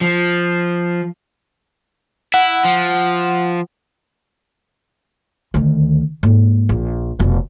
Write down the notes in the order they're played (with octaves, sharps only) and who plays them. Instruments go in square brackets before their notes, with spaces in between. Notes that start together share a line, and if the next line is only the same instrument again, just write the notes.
[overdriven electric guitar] F3
[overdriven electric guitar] E4 [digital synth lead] F#5
[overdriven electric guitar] F3
[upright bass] D2 D#3
G#2 A#3
A#1
F1 B2